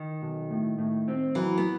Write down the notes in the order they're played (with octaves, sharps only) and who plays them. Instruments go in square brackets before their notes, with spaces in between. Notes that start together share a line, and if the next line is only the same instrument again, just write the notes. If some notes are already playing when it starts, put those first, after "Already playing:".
Already playing: [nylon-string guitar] D#3
[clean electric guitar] B1
A2
A2
C4
[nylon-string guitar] E3 [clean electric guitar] F#3
[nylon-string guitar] B3